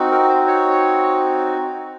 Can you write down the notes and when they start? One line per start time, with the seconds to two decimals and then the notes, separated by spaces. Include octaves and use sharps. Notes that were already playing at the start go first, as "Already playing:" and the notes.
Already playing: C4 D#4 F#4
0.12 A#4
0.29 C5
0.47 C#5